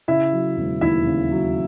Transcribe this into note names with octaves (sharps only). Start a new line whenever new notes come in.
C#3 E4 E5
F#3
E1
D#2 E4 E5
C#3
F#3